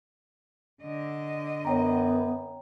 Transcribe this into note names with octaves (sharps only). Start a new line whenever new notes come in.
D3 D#5
F#2 B3 C#5 G5 A#5